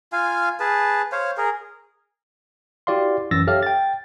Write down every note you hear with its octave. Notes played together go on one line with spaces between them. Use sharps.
F4 F5 G#5
G#4 B4 A5
C5 C#5 F5
G#4 A#4
E4 F#4 G4 D5 F5 C6
A1 F#2 E3 E6 A6 A#6
G4 A4 C#5 E5 F5 F6
G5 A6